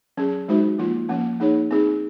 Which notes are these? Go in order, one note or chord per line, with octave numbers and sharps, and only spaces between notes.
F#3 C#4 G#4
G#3 D#4 F#4 C5
F3 A#3 F4
F3 A#3 C#4
A#3 D#4 G#4 C#5
C4 D#4 G#4